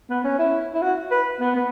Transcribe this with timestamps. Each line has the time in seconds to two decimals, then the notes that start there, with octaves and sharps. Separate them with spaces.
0.10 B3
0.24 C#4
0.39 E4
0.74 E4
0.82 F#4
1.11 B4
1.41 B3
1.55 B3